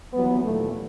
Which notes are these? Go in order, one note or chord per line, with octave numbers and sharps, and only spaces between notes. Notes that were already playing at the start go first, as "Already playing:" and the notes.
D#2 E3 F#3 G3 B3
D#2 A#2 E3 F#3 A3